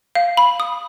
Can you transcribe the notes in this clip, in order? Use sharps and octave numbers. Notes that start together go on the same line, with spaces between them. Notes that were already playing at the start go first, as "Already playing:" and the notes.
F5
B5
D#6